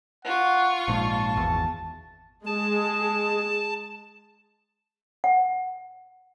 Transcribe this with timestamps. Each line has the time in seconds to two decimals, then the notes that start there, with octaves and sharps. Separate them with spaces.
0.25 F4 F#5 C#6
0.88 A#1 G#2 A5
1.36 G#1 E2
2.46 G#3 G#4 A5
5.24 F#5